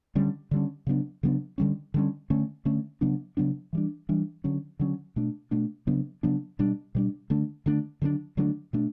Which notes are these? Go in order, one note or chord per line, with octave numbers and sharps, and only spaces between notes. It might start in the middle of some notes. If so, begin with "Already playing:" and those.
D3 G3 C#4
D3 G3 C#4
C#3 F#3 B3 D4
C#3 F#3 B3 D4
D3 G3 C#4
D3 G3 C#4
D3 A3 C#4
D3 A3 C#4
C#3 F#3 B3 D4
C#3 F#3 B3 D4
E3 G3 D4
E3 G3 D4
D3 F#3 C#4
D3 F#3 C#4
B2 A3 D4
B2 A3 D4
C#3 F#3 B3 D4
C#3 F#3 B3 D4
B2 G3 D4
B2 G3 D4
D3 A3 D4
D3 A3 D4
D3 F#3 A3 D4
D3 F#3 A3 D4
B2 A3 D4